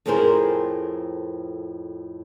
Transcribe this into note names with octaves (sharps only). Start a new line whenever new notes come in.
F2 A2 C4 G#4 A#4 C5